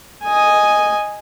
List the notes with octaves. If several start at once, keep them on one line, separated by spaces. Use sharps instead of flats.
D#5 G#5